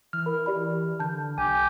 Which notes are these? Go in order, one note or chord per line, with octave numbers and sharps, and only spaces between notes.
E3 F6
A#4 B5
G4 D5 B5
D3 A5 G6
B1 G4 G#5